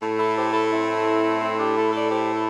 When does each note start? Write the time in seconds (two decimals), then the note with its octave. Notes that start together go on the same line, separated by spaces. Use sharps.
0.01 A2 A3
0.18 E4 A4
0.35 G4 C5
0.53 E4 A4
0.71 C4 E4
1.40 C4 E4
1.57 D4 G4
1.74 E4 A4
1.92 A4 D5
2.09 G4 C5
2.33 E4 A4